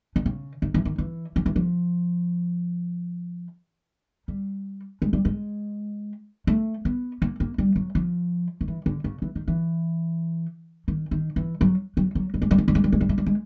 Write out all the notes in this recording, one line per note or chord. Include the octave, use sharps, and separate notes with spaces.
D3
C#3
D#3
E3
D#3
E3
F3
E3
F3
G3
G#3
G3
G#3
A3
B3
A#3
A#3
G3
F#3
F3
D#3
E3
D3
C#3
E3
D#3
E3
D#3
D#3
E3
F#3
F#3
F#3
G3
G#3
G3
G#3
G3
G#3
G3
G#3
G3
G#3
G3
G#3